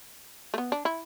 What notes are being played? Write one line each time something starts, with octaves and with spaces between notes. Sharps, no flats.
A3
B3
D4
E4